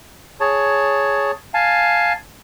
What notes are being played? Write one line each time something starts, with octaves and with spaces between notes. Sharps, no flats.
G#4 C#5 A5
F5 G#5 A5